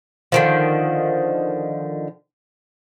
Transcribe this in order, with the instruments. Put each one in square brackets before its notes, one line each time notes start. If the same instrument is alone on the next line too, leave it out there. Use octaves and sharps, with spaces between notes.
[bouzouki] D3 D#3 F3